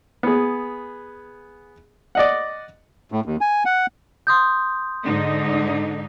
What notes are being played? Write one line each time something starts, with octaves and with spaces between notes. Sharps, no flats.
B3 G#4
D5 D#5 F#5
A2
D#2
G#5
F#5
C6 D#6 G6
G#2 D3 D#4